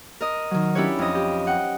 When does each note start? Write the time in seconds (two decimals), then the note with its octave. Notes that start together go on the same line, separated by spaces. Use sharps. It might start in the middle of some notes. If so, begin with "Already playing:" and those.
0.21 A#4 D#5
0.51 D#3 F#3
0.75 C#4 D4 E4 G4 B4 C#5
0.99 F2 D#5
1.15 G4
1.47 F#5 G5